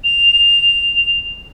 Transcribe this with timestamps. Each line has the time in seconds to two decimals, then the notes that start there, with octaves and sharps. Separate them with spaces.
0.04 F7